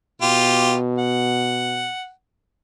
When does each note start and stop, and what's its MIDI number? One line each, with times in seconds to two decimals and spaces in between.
0.22 1.92 47
0.22 0.75 65
0.22 0.75 67
0.98 2.10 78